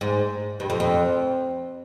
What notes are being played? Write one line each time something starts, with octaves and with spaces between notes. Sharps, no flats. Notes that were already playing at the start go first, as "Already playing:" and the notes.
G#2
G2
F2
F2